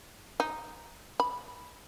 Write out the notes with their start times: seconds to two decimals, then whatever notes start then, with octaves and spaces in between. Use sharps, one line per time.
0.40 D#4
1.20 B5